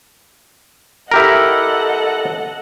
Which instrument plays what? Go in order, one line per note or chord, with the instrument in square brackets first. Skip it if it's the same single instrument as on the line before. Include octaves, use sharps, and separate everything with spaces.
[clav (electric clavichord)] E4 G4 A#4 [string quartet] A4 D#5 F#5